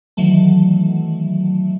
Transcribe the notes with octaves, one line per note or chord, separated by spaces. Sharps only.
D#3 E3 F#3 A3